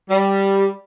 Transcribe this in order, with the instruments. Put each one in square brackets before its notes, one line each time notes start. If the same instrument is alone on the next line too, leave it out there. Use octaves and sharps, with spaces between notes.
[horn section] G3